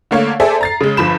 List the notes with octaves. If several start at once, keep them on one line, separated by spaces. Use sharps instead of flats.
D3 A3 A#3 C#5 F5
G#4 A4 C5 D5 E5
A#5 A6 C7
C#3 G#3
G1 F3 B5 E7